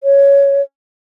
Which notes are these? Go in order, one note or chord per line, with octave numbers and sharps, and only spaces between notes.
C#5